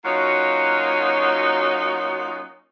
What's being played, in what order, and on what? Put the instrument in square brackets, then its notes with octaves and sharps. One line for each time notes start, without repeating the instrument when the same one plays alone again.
[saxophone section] F#3 A#3 C#4 D#4 F4 F#4